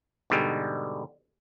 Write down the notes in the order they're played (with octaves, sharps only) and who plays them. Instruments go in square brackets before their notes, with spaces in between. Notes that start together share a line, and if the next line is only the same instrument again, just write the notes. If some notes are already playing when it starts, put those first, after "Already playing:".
[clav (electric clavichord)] G#2 B2 D3 G3 G#3